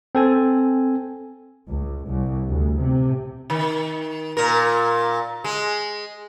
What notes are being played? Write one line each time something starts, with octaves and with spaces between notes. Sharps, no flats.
C4 A4 G#5
C#2
C2
D2
C3
D#3
A#2 A#4
G#3